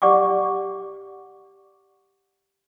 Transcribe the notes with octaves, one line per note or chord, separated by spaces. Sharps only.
G4 D5 F#5 C#6 D6